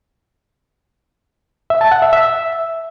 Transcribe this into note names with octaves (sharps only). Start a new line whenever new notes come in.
E5
A5
F#5
E5
E5